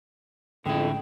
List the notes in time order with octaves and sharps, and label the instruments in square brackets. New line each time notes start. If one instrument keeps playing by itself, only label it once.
[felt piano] A1 G#3 D#6 [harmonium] F2 [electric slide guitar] D3 E4 [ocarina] G5